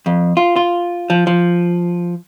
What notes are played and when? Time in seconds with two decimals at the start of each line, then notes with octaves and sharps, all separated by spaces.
0.06 F2
0.37 F4
0.56 F4
1.10 F3
1.27 F3